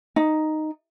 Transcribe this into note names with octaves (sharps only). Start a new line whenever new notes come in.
D#4